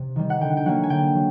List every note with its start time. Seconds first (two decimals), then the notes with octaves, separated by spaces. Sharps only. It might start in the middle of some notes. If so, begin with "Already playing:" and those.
Already playing: C3
0.16 D#3 G3
0.30 F#5
0.41 D3 G5
0.57 G5
0.65 F#3 A#3 F#5
0.83 G#5
0.89 D3 G5
1.15 F#3